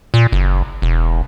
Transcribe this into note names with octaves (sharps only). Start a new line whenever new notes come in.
A#2
F#1
E1